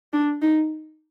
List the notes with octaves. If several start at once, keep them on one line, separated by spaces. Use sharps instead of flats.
D4
D#4